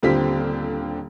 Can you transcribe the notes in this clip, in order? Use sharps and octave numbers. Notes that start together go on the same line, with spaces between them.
D#1 D3 C4 F4 G4 B6